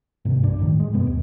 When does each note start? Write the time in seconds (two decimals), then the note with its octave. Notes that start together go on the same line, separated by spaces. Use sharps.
0.25 G#2 C3
0.43 B1 G2 D4
0.59 F2 A2 D#3
0.80 G#3
0.93 G2 B2 B3
1.07 D#2